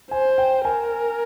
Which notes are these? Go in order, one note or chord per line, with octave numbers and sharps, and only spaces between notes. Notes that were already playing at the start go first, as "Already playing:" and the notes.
C5 G#5
G5
A#4 G#5